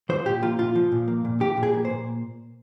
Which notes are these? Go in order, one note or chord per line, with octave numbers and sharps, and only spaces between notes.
F3 C5
A#2 G4
A#3 F4
A#2 F4
F3
A#2
A#3
A#2
F3 G4
A#2
G#4
A#3
C5
A#2